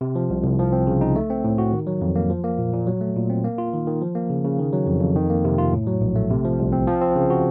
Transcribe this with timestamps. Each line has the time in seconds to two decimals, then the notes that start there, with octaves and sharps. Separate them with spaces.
0.01 C3
0.15 F3
0.30 C2
0.45 C2
0.59 F3
0.73 C4
0.87 C#3
1.01 D#4
1.16 A3
1.30 C4
1.44 A2
1.58 F#4
1.73 D#3
1.87 F#3
2.01 F2
2.16 A#3
2.30 F3
2.44 A#3
2.59 A#2
2.73 A#2
2.87 F#3
3.01 A3
3.16 A#2
3.30 C4
3.45 A#3
3.58 F4
3.73 D#3
3.87 D#3
4.02 F3
4.15 A#3
4.30 C#3
4.45 C#3
4.59 D#3
4.73 F#3
4.87 F2
5.01 F2
5.16 D#3
5.30 A#3
5.45 C3
5.58 F4
5.73 A2
5.87 F#3
6.01 A#1
6.16 A3
6.30 C3
6.45 F3
6.59 C2
6.73 C4
6.87 F3
7.01 C4
7.16 C#3
7.30 F#4